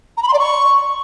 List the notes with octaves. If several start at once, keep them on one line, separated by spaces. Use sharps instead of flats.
A#5
B5
C6
D5
C#6